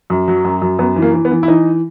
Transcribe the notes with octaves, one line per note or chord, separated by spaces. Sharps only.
F#2
F#3
F#2
F#2
F#2 B3
E3
A#3
E3
B3
E3
E4
E3 D#4